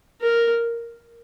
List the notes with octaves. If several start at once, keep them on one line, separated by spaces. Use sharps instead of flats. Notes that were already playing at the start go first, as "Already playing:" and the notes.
A#4